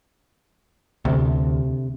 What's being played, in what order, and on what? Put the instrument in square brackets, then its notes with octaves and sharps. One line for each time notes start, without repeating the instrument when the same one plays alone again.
[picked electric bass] D2 [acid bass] C3